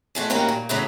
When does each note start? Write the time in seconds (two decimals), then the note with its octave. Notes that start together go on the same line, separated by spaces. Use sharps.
0.15 G#3 A3 F#4
0.30 G2 D#3 A#3 C#4 F#4
0.48 A#2
0.69 F#2 A2 C#3 E3 F#3